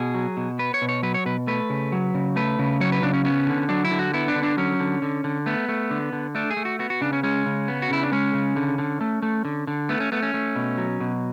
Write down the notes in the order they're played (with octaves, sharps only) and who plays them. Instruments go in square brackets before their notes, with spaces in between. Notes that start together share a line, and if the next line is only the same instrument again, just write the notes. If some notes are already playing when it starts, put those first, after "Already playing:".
Already playing: [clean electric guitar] B2 G#4
F#3
B2
B3 B4
C#5
B2
C#5
F#3 B4
C#5
B2 B4
A3 B4
C#3
F#3
C#3
A3 B4
C#3
F#3 C#5
B4
C#3 D4
C#4
B3 C#4
D3
F#3 D4
E4
D3
F#4
B3 E4
D4
D3
D4
F#3 C#4
D3
D3
D3
A3 B3
A3
D3
D3
A3 D4
G#4
A3
F#4
B3 F#4
F#4
C#3 D4
C#4
G#3 C#4
C#3
B3
F#4
C#3 E4
D4
G#3 C#4
C#3
D3
D3
A3
A3
D3
D3
A3 B3
C#4
A3 B3
C#4
A3
B2
F#3
B2